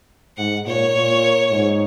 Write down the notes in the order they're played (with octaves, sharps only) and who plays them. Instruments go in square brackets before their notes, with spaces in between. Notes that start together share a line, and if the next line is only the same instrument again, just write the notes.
[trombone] G#2 [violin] F#5
[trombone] A#2 [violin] C#5
[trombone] A#2
G#2